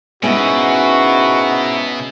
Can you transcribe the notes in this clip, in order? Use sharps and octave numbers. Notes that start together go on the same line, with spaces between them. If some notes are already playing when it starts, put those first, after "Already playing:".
G#2 B2 B3 C#4 E4 F#4 G#5